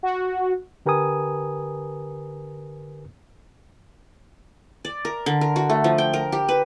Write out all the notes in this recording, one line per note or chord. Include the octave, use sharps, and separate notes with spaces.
F#4
D3 G4 A#4 B4 G#5 D#6
D5
A#4
D3
A#4
F#4
A3
F3
G5
A#4
G4
B4